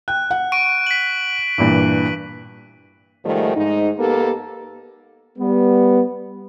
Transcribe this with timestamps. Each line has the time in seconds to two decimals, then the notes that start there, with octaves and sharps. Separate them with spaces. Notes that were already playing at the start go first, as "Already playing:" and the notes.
0.08 G5 F#6
0.31 F#5
0.52 C#6 D7 D#7
0.87 B6 F#7
1.58 G2 A#2 E3
3.25 G#2 D#3 F3 G3 A3
3.57 G#2 D#4
3.99 A#3 B3 G4 A4 A#4
5.39 G3 B3